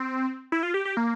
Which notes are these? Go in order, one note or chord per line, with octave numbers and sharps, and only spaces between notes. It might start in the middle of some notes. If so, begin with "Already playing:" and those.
Already playing: C4
E4
F4
G4
G4
A#3